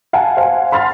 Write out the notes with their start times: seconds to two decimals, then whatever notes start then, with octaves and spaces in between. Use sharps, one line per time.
0.13 F5 F#5 G#5 A5
0.37 C5 F5 F#5 G#5
0.72 B5 C6 F6 A6